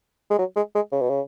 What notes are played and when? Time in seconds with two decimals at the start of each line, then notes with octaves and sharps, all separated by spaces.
0.30 G#3
0.39 F#3
0.56 G#3
0.75 G#3
0.92 C#3
1.01 B2
1.10 C#3